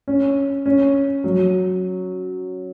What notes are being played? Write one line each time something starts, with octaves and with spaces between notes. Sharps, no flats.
C#4
C#4
F#3